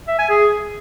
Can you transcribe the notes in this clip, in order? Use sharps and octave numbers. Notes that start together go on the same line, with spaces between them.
E5
G#5
G#4